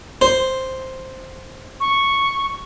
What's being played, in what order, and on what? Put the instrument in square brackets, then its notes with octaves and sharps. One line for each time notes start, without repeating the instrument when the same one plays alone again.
[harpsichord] C5
[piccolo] C#6